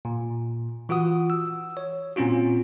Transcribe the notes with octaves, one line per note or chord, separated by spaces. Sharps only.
A#2
E3 F4 F#4 F#5 D#6
E6
C#5
A#2 C4 C#4 F4 F#4